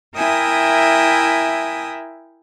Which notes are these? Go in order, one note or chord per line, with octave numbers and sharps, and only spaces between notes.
E4 A#4 E5 G5 G#5 D#6